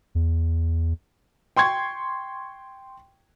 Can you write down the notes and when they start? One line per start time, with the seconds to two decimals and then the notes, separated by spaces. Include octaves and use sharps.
0.15 E2
1.57 G5 C6 C#6 G#6